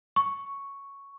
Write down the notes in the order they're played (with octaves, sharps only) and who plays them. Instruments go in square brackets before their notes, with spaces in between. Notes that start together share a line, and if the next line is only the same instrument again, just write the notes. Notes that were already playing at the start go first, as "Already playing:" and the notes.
[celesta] C#6